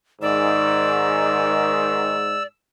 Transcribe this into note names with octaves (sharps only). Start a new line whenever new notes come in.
G#2 D#3 D5 E6